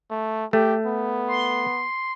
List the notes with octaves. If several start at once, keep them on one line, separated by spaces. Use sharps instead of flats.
A3
A3 G4
B3
C6